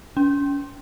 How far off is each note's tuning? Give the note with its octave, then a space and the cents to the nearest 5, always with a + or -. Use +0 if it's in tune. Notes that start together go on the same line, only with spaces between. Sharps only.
C#4 +35